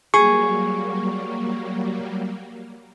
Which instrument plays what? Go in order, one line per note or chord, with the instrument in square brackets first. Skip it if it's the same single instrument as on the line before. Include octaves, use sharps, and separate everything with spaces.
[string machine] F#3 G3 A#3 [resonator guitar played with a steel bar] G#4 [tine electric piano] C#6